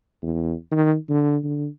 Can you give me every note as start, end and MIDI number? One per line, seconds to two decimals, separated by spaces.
0.22 0.53 40
0.71 0.94 51
1.09 1.38 50
1.44 1.66 50